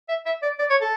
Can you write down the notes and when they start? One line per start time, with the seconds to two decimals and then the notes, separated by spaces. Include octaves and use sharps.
0.09 E5
0.26 E5
0.42 D5
0.59 D5
0.70 C#5
0.82 A4